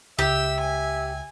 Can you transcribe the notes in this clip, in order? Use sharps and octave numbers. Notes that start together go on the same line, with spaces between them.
C#2 G4 E5 E6
G#5